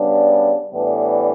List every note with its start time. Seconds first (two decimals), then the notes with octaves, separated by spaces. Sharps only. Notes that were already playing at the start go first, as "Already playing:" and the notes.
Already playing: C#3 G3 B3 D4
0.73 A2 E3 G3 B3 D4